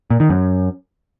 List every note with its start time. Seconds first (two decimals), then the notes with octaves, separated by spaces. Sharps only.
0.10 A#2
0.20 D#3
0.29 F#2